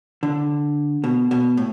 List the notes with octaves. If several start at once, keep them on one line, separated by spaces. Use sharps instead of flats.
D3
B2
B2
A2